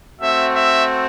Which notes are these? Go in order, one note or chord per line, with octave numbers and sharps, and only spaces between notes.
A3 C4 F#4 E5
E5